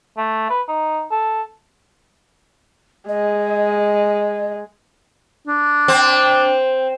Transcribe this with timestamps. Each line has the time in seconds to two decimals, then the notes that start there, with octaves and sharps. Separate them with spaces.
0.18 A3
0.50 B4
0.69 D#4
1.12 A4
3.09 G#3 D#5
5.48 D4
5.88 C4